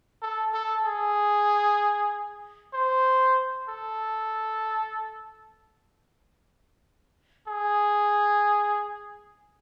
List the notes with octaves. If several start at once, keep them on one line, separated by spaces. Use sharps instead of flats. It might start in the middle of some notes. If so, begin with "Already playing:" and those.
A4
A4
G#4
C5
A4
G#4